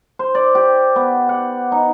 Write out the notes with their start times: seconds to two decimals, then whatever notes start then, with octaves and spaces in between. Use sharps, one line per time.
0.19 C5
0.35 D5
0.55 G4
0.96 B3
1.29 F#5
1.72 D#4